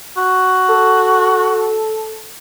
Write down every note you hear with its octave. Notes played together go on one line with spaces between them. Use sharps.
F#4
A4